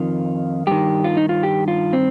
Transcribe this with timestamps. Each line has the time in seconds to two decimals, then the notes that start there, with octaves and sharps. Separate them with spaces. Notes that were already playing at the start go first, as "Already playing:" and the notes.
Already playing: F2 D#3 F4
0.67 G2 D#3 G4
1.04 F4
1.17 D#4
1.29 F4
1.43 G4
1.68 F4
1.93 C4